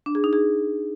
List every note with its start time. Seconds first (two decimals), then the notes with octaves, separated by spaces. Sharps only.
0.06 D4
0.15 G#4
0.24 D#4
0.33 G#4